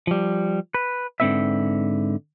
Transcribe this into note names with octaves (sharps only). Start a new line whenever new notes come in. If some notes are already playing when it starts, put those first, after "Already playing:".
F3 G3
B4
G#2 D3 C4 C#4 B4 E5